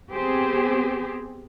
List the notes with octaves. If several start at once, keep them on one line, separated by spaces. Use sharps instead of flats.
B3 C4 G4 G#4 C5